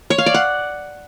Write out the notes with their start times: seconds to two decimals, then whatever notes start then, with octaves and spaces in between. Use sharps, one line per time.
0.10 C#5
0.18 F5
0.26 D5
0.34 F#5